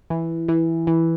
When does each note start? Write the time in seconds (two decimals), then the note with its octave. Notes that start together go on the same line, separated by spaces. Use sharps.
0.10 E3
0.48 E3
0.87 E3